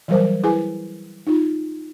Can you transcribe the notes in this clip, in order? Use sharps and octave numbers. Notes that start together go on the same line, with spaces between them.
E3 F#3 G3 A#4 C5
E4 G#4 B4 G#5
D#4 F4